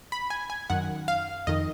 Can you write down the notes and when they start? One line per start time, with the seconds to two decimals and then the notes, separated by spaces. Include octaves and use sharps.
0.12 B5
0.30 G#5
0.50 G#5
0.70 F#2 D#3 F#5
1.08 F5
1.47 F2 D#3 D#5